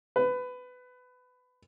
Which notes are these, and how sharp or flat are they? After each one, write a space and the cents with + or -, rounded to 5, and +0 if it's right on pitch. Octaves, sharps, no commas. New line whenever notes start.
B4 +20